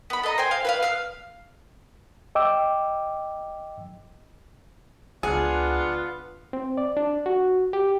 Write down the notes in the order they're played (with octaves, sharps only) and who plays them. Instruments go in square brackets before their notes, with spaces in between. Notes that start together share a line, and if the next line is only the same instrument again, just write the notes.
[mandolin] B3 B5
A4 D#5 A#5
C5 G5 G#5
F5
B4 C#5 F5
F5 F6
[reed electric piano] D#5 G5 D6 E6
[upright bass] C#2 [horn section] B3 F4 [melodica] D4 F#5 [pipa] G#4
[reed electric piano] C4
D5
D4
F#4
G4